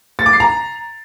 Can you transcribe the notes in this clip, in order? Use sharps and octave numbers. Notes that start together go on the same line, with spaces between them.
A6
D6
C7
A#5